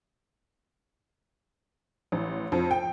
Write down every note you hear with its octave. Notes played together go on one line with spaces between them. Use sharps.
A1
F2
G5